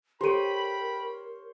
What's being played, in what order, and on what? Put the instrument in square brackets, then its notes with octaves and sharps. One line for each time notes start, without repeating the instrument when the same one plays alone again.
[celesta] G4 A4 D#7 [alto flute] A#4 [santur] C5 C#5 [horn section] G5 B5